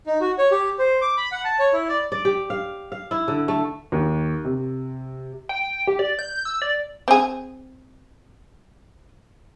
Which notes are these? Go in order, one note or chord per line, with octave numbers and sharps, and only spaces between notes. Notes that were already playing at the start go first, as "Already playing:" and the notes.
D#4
F#4
C#5
G4
C5
D6
B5
F#5
A5
C#5
E4
D5
D5
G4
F5
F5
E4
D3
A3
D#2
C3
G5
G4
D5
G6
E6
D5
C4 G#4